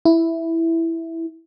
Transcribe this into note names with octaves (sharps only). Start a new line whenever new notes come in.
E4